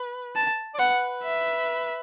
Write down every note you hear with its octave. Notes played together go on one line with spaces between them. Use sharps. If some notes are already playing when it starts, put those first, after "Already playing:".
Already playing: B4
A5
D5
B4 F#5
E5